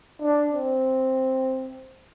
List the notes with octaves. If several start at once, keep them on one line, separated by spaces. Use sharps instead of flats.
D4
C4